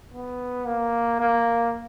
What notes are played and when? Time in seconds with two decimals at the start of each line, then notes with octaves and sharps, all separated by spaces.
0.14 B3
0.67 A#3
1.20 A#3